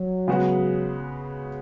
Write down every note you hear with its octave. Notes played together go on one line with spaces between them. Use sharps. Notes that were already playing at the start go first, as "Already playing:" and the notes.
Already playing: F#3
C#3 G#3 B3 F#4